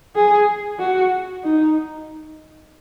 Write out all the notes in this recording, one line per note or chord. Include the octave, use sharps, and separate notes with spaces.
G#4
F#4
D#4